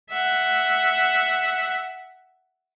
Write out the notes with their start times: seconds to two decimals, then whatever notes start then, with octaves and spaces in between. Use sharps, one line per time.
0.11 E5 F#5